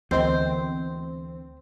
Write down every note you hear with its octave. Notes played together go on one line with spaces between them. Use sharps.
D2 E3 B3 C4 A#4 C5 D#5